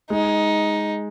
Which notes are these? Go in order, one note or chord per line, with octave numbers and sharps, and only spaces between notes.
G#3 D#4